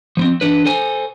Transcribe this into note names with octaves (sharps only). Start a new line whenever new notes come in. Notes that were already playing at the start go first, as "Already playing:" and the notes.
F3 B3 C4
E3 D4 B4
A4 C5 G#5